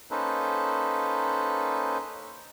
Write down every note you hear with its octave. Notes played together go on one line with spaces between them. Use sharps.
A#3 C#4 D#4 A4 B4 C5